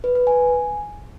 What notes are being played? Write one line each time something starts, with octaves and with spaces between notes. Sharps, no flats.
B4
B4
G#5